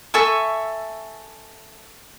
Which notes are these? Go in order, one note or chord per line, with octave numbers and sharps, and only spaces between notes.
A4 E5 G#5 C#6